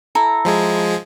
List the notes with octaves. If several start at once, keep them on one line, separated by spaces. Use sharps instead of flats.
E4 A4 A#5
F3 G#3 G#4